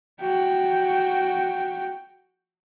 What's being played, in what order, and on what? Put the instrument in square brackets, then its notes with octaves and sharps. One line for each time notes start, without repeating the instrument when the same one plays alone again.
[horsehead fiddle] F#4 G5